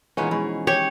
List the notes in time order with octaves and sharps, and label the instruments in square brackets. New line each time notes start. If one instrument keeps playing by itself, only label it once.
[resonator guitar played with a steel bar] A#2 G#3 B3 [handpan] E3 D#4 [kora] C#4
[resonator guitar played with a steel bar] B2 G#4 [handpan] F3 G#3
[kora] G4 [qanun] C#5